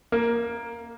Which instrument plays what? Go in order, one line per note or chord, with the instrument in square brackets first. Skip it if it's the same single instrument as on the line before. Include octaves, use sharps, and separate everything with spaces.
[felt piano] A#3